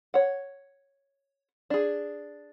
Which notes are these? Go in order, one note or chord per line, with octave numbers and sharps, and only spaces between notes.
C#5 F#5
D4 G#4